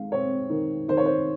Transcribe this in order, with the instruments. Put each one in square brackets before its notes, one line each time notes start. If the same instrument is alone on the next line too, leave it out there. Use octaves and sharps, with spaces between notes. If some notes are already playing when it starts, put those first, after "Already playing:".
Already playing: [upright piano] D#3 G#3 F5
C4 C#5
D#3
D#3 C5
C#5
C5